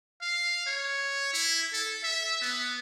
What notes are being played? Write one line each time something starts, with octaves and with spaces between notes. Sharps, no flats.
F5
C#5
E4
A4
E5
B3